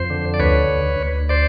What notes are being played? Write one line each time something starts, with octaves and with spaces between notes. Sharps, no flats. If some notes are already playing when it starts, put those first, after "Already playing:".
Already playing: F2 C5
D3
D5
D2 B4 C#5
D2
D2
C5 D5